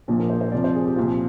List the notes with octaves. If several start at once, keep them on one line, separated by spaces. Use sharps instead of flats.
A#1 A#2 F3
A#4
C5
C5
C2 C3 F3 D5
C5
G#4
G4
C2 A#2 F3 F4